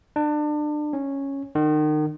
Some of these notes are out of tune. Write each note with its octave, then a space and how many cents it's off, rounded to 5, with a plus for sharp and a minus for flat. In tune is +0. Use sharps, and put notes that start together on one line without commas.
D4 +30
C#4 -5
D#3 -35